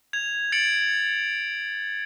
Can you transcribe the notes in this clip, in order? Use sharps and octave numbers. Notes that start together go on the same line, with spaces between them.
G#6 F7
G#6 A6 C#7 D7 F#7